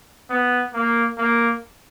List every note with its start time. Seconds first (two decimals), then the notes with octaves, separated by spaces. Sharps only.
0.30 B3
0.73 A#3
1.18 A#3